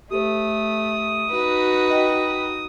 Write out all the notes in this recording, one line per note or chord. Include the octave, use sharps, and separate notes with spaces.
A3 G4 A4 C5 D#6
D#4 F#4 B4
D#5 G5